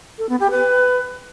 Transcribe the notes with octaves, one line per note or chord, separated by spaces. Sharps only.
A4
B3
G4
B4